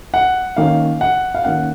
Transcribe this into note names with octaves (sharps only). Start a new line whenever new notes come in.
F#5
D#3 A#3 C#4 F5
F#5
F5
D#3 A#3 C#4 F#5